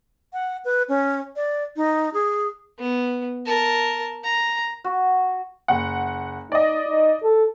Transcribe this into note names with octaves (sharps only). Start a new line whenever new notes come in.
F#5
B4
C#4
D5
D#4
G#4
B3
A#4 A5
A#5
F#4
F#1 F#5
D#4 D5 D#5
D#4
A4